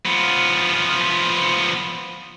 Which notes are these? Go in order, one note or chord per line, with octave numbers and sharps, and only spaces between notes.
F3 B3